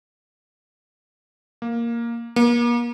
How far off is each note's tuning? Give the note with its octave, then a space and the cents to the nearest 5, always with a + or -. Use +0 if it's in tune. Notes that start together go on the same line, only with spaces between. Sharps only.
A#3 +0
A#3 +35